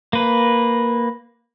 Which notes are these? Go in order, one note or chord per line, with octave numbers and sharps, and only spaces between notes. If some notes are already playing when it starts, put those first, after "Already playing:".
A#3 B4